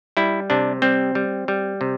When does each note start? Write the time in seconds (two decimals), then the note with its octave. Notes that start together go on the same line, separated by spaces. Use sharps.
0.17 G3 E4
0.50 C3 D4
0.82 G3 C4
1.15 G3
1.48 G3
1.81 C3